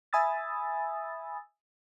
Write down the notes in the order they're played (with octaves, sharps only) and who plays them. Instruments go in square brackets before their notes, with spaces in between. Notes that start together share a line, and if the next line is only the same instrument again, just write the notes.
[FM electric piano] E5 G#5 B5 D#6 E6 A6